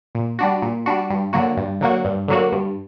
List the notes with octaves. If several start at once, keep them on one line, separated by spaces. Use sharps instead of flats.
A#2
G3 D4 F#4
A#2
G3 D4 F#4
G2
D3 F#3 A#3 F#4
G2
D3 F#3 A#3 F#4
G2
D3 F#3 A#3 F#4
G2